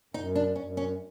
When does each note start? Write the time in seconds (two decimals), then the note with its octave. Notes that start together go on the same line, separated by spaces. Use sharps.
0.14 F#2 D#4
0.35 D4
0.55 F#2 C#4
0.77 C#4